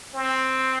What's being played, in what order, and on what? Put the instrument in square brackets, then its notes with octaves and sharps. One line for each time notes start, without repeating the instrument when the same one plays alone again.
[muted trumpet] C4